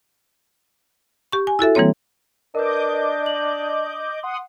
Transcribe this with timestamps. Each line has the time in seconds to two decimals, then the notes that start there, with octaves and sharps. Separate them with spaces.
1.32 G4 C#6
1.47 G#5
1.59 E4 F#4 A4 E5
1.75 E3 G3 A#3 C4 C#5
2.55 D4 A#4 B4 D#5 D6 G6
3.26 F#7
4.23 F#5 C6 D#6